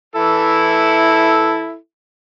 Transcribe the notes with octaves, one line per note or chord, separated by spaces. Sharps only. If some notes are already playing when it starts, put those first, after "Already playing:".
E3 E4 A4